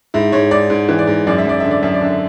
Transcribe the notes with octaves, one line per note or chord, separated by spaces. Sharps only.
G#2 E4
G#2 C#5
G#2 D5
G#2
E3
D5
G#2
F#2 D5
E5
F#2 D5
D3 E5
D5
F#2 E5
D5
D3 E5